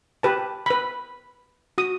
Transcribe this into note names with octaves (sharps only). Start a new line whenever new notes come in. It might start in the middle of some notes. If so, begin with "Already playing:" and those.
G4 B4 A5
B4 B5
F#4 D#6